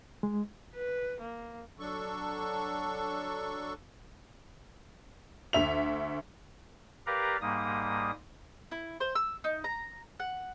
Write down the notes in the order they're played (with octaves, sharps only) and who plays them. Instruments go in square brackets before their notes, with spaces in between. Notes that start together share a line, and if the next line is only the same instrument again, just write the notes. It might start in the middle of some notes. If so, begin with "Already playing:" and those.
[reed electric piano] G#3
[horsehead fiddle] B4
A#3
[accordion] F#3 D4 A4 C#6
[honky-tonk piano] D2 E5 F7
[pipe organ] G4 A#4 B4 D5 F5 A#5
G#2 G3 A#3 D#6
[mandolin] E4
C5
E6
D#4
A#5
F#5